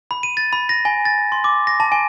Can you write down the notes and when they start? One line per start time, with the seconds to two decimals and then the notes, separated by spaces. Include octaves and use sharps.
0.11 B5
0.23 D#7
0.37 A6
0.53 B5
0.69 A#6
0.85 G#5
1.05 A6
1.32 C6
1.44 D6
1.67 A#6
1.80 A5
1.92 G#5